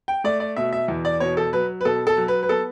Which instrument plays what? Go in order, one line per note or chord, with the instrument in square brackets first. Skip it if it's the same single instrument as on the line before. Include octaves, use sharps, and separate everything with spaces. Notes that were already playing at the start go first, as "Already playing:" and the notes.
[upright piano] G5
A3 D5
D5
B2 E5
E5
E2
D5
B2 C#5
A4
F#3 B4
B4
B2 A4
A4
F#3
B4
B4
B3 A4